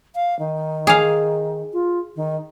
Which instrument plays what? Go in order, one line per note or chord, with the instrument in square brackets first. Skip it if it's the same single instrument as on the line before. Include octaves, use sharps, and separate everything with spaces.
[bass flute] F5
D#3
[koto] G#4 F5
[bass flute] F4
D#3